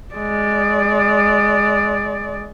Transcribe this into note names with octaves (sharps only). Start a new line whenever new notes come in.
G#3 D5